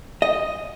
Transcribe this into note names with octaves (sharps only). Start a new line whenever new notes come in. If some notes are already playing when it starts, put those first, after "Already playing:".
D#5